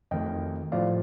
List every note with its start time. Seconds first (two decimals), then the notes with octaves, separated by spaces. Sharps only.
0.11 F2 D#3 A3 D#5 G5
0.72 A2 F3 A3 D5 F5